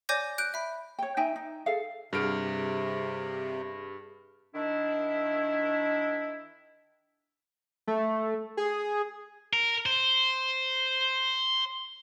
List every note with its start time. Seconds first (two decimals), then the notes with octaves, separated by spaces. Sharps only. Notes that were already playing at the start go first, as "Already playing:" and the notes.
0.09 C#5 D5 G#5 D6 G6 A#6
0.38 F#6 G6 D7
0.54 E5 B5
0.99 C#5 G5
1.17 D#4 E5 G5 G#5
1.36 D#4
1.66 G#4 A4 F5
2.13 G2 C3 G4 G#4 F6 D7
4.54 D#3 D4 E4
7.87 A3
8.57 G#4
9.53 A#4
9.86 C5